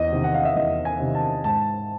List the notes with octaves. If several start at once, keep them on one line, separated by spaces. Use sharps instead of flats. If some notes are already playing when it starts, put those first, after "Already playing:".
Already playing: E2 D#5
C3 D#3
F#5
F5
E5
E2 D#5
G#5
C3 D#3
A5
G#2 A5